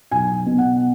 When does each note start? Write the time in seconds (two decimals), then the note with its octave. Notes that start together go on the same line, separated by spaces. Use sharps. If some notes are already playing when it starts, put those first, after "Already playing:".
0.11 B1 G#5
0.46 B2
0.58 F#5